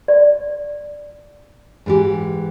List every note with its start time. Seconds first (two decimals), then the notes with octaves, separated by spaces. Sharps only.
0.08 D5
1.86 G#2 E3 G4